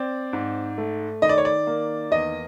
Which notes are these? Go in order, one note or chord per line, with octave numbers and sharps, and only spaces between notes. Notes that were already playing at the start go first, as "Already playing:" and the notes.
Already playing: C4 D5
G#2
A3
D#3 D#5
D5
C#5
D5
A#3
E2 D#5